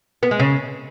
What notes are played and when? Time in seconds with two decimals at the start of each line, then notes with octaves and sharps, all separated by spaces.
0.23 B3
0.31 G#3
0.40 C#3